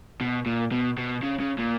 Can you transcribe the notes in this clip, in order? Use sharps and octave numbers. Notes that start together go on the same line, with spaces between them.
B2
A#2
B2
B2
C#3
C#3
A#2